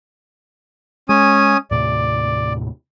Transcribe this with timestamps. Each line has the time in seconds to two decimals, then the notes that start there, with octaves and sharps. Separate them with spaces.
1.09 G#3 C#4 G#5 D#6
1.71 D#2 A2 C3 D5